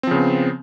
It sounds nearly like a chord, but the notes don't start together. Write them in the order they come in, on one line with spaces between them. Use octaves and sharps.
C4 F3 C#3 B3